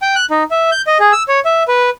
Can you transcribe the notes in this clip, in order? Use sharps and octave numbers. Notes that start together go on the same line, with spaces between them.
G5
F#6
D#4
E5
G6
D#5
G#4
E6
C#5
E5
B4